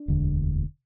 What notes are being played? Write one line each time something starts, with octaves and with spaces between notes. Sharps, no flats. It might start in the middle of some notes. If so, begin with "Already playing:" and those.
Already playing: D4
E1 D2 D3